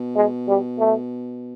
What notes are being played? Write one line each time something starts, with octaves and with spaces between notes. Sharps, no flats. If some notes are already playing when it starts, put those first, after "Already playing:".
Already playing: B2
G#3
G3
A3